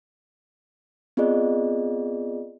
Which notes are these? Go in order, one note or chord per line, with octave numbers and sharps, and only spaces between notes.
B3 C4 F4 G#4 D5 D#5